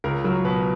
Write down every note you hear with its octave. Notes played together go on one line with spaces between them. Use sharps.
C#2 A#4
F#3 A#4
B2 B4